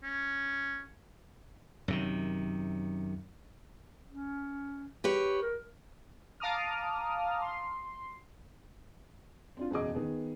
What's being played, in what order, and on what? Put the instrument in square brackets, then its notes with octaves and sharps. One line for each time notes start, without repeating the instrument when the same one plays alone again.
[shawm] C#4
[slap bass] F#2 C3 D#3
[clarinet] C#4
[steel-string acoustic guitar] G4 B4 C#5
[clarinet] A#4
[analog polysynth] F5 A5 A#5 D6 D#6 F6
C6
[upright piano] C4 D4 F4
F#1 E2 B2 G#4 D#5 D6
D#3 B3 G#4